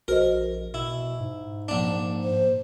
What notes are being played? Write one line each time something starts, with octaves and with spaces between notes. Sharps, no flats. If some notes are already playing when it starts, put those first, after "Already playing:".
A#1 F#4 A#4 C5 D#5
B2 E4
G#2
A#1 D4
C5